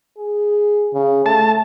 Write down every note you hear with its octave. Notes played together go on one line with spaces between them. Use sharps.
G#4
C#3
A3 A5